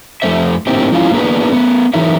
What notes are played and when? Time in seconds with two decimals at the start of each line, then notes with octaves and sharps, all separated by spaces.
0.22 F2 A3 B3 C5 E5
0.67 A2 D3 A#3 C4 D#4 G4
0.92 F3 G#3 C#4 E4 F4
1.12 A#3 B3 D4 F#4 G#4 B4
1.52 A3 B3
1.94 E3 F#3 D#4 G#4 A#4 E5